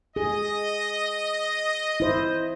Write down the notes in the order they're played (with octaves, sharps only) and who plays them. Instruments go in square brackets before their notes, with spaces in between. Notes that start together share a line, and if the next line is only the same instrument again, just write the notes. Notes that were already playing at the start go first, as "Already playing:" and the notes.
[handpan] G#4 [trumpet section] D#5
[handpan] E4 C5